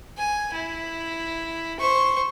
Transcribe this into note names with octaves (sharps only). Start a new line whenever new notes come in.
G#5
E4
C5 C#6